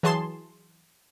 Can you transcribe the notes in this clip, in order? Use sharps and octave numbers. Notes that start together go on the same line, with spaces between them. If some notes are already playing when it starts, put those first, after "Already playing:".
E3 F#3 G#4 A5 C6 E7